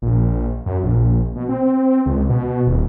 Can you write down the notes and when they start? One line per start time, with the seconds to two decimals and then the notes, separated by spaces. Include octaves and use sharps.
0.02 A#1
0.66 F#2
0.83 A#1
1.36 B2
1.49 C4
2.06 C#2
2.29 B2
2.67 D#1